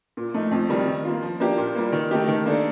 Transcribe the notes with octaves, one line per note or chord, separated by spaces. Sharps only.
A#2
F3 A3 D#4
F2
D#3 G3
D#3
A#3 F4
F3
A#3 D4 G4
A#2
G3 A#3
D#3
A3 D#4 G4
D#3
A#3 D4 A4